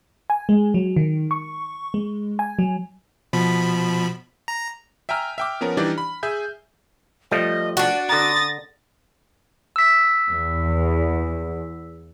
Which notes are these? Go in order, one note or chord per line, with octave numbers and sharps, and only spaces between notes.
G#5
G#3
F#3
D#3
C#6
G#3
G#5
F#3
B2 F3 B5
A#5
E5 G5 G#5 A#5 F6
E5 G5 D6
F3 B3 C#4 A#4
E3 G3 D4 D#4 G4 D5
B5
G#4 E5 G#5 G6
F3 G3 A3 D#5
D4 F#4 D5
D3 A#5 D#6 A6 A#6
E6 B6
E2